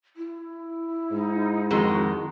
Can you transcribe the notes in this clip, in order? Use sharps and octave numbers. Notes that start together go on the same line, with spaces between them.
E4
G#2 D#4
F2 D#3 G#3 F#4